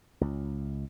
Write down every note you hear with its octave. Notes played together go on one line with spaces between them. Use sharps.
C#2